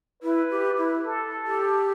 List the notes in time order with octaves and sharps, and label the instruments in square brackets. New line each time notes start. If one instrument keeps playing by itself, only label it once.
[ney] E4 [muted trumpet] B4
[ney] G4
E4
[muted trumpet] A4
[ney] G4